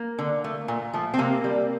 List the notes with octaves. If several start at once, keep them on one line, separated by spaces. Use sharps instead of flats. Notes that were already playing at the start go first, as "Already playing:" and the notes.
Already playing: A#3
D3
A3
A#2
F3 A3
C4
C3 A#3
G3